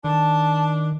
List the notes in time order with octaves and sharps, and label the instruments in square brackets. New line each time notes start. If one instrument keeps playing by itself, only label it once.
[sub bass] D#3 [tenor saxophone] D4 [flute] A5